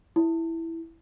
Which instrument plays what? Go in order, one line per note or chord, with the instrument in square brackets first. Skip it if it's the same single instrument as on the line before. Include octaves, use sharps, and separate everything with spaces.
[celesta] E4